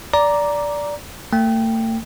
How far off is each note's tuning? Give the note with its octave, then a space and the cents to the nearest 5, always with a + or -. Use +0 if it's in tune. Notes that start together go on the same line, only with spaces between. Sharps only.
D5 -10 A#5 +5 D6 +0
A3 +40 G5 +0